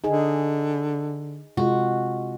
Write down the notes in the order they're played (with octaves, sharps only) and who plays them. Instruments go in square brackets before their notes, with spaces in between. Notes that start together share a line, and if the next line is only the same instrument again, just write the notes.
[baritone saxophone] D3 [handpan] D#4 G#4
[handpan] C3 G#3 F4 [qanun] F#4